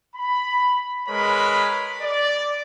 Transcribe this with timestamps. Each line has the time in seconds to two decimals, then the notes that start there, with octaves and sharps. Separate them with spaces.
0.16 B5
1.08 G#3 A#4 B4 C#5 B5
2.01 D5